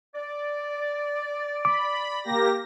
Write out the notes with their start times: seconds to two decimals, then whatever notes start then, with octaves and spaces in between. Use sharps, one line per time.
0.15 D5
1.65 B5 D6
2.23 A#3 G4 A#6